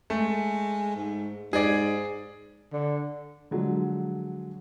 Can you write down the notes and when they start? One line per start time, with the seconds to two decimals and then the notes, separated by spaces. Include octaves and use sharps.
0.10 G#3 A3
0.96 G#2
1.53 G#2 G#4 D5
2.73 D3
3.51 D3 F3 F#3 G#3